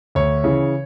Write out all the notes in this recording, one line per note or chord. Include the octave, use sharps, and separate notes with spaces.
D2 C#5
C#3 E3